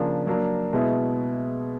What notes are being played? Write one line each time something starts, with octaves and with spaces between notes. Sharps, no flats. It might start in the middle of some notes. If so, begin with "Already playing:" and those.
Already playing: C#3 F3 A#3 D4
F#3 A#3 D4
B2 G#3 B3 E4